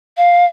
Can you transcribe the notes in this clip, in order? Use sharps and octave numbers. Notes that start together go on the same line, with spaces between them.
F5